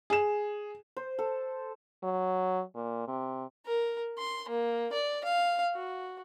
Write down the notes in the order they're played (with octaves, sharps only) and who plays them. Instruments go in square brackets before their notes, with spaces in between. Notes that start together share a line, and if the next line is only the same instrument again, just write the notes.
[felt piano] G#4 E7
[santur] C5
A4
[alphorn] F#3
A#2
C3
[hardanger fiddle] A#4
C6
A#3
D5
F5
F#4